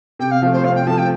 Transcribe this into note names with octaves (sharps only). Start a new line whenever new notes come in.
C3 G5
F5
F3 A3
C5
C3 F5
G5
F3 A3 A5
G5